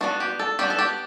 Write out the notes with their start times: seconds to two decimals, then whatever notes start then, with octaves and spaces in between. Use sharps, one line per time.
0.01 G3 B3 D4 F#4
0.20 G4
0.39 A4
0.59 G3 B3 D4 G4
0.70 A4
0.79 G4